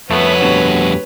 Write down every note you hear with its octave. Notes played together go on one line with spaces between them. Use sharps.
F2 A3 B3 F#4 B4 C#5
D2 G2 B2